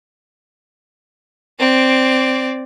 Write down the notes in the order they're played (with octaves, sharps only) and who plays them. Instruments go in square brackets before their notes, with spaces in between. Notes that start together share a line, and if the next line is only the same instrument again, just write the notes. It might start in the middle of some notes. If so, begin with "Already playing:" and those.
[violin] C4 D5